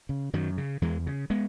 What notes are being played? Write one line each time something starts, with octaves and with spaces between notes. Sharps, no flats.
C#3
F#2 D#3 F#3
C#3
E2 E3 G#3
C#3
G#3 B3